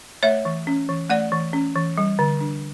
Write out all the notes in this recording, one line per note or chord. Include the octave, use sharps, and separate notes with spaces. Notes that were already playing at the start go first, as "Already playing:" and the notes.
A3 C#5 E5
E3
C#4
E3
A3 D5 F#5
E3
C#4
E3
G3
D3
D4